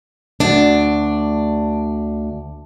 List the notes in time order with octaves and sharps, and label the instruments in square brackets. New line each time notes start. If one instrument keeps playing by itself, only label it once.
[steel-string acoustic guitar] D2 D4